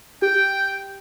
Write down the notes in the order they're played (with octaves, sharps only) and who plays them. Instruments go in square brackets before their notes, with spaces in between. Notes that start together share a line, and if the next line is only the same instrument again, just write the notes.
[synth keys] G4 [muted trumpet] G5